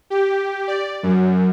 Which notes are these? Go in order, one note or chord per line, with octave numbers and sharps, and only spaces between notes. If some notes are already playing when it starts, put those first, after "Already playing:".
G4
D5
F#2